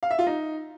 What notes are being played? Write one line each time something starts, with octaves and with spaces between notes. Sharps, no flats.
F5
E5
F4
D#4